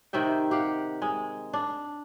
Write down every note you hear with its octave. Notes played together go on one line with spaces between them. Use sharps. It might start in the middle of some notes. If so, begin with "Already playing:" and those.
C3 D#3 E5 G5
G4 F5 F#5
G#3
D4